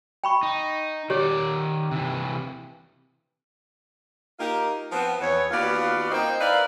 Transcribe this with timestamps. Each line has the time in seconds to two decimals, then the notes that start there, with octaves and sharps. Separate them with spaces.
0.24 G5 B5 C#6
0.43 D#4
1.10 D#3 G4 C#5 D5
1.91 C3 E3
4.40 A#3 D#4 F4 G4 A#4
4.92 F3 B3 C4
5.20 E2 B3 C#5
5.51 D#2 B3 F4 F#4 D5 F5
6.11 A#3 C4 D#4
6.40 E4 A#4 B4 D5 F5